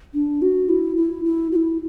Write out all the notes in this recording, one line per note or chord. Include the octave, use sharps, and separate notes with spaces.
D4
F#4
E4
E4
E4
F#4
E4